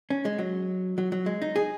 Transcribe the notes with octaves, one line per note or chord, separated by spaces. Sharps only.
C#4
G#3
F#3
F#3
F#3
G#3
D#4
G#4